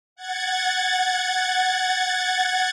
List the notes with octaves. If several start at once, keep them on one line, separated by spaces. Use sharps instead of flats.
F#5 G#6 A6